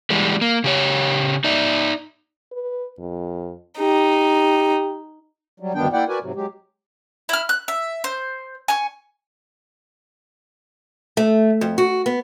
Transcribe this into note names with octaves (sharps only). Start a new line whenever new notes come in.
E3 G3 G#3
A#3
C#3 G4 C#5
D#4 D5 E5
B4
F2
D#4 G4
F#3 G3
D2 G2 D#3 B3 D4 G5
A#3 E4 D5 F#5 G5
F#4 A#4 B4 D5 G#5
G#2 C3 F#3
F#3 G#3 G4
E4 F6
F#6
E5
C5
G#5 C#6
A3
F2
F#4
B3